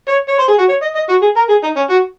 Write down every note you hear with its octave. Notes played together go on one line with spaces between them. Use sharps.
C#5
C#5
C5
G#4
F#4
C#5
D#5
D#5
F#4
G#4
A#4
G#4
D#4
C#4
F#4